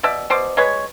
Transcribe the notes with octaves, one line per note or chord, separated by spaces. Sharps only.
B2 D5 E5
B2 C5 D5
G#3 B4 C#5